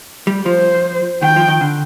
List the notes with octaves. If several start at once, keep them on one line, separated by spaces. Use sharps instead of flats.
G3
F3 C5
D#3 G5
F3
D#3
D3